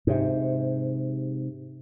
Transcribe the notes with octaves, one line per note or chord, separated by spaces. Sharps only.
G#2 C3